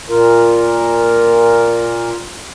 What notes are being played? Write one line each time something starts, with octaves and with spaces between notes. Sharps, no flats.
A#2 F4 A#4